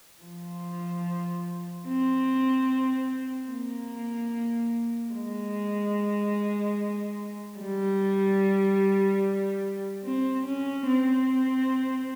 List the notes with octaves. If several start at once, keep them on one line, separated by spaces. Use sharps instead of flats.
F3
C4
A#3
G#3
G3
C4
C#4
C4